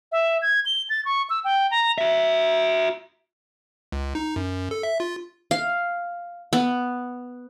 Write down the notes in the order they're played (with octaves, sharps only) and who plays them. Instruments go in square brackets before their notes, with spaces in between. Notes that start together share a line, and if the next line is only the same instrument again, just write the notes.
[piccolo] E5
G#6
G7
A6
C#6
E6
G5
A#5
[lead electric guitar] F#4 E5
[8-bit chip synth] C#2
D#4
F#2
A4
E5
F4
[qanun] F5
B3